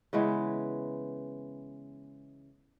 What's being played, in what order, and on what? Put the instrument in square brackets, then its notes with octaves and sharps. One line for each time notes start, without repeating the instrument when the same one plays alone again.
[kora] C#3 E3 G#3 B3